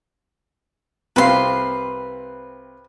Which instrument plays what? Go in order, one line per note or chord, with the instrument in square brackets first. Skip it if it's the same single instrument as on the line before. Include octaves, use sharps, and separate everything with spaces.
[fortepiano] C2 C4 F5 [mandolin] B4 C6